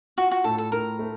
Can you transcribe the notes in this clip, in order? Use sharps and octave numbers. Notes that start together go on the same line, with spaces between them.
F4 F#4
F#4
A2 A4
A4
A2 A#4
A3